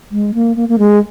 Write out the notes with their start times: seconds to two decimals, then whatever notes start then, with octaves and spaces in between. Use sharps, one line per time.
0.11 G#3
0.34 A#3
0.56 A#3
0.69 A#3
0.78 G#3